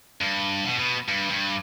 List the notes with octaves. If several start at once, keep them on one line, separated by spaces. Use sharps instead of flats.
G2
B2
B2
G2
G2